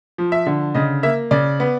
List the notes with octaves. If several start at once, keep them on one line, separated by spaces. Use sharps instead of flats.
F3
E5
D3
C#3 D#5
A#3 E5
C#3 D5
B3